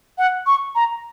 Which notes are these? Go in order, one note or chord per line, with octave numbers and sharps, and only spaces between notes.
F#5
C#6
A#5